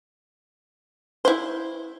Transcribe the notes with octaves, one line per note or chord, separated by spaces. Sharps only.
E4 C5